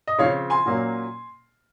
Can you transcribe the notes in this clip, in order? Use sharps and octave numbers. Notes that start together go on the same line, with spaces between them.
D#5
C#3 F3 C4 C#5 F5
G#5 C6
A#2 F#3 A#3 C#4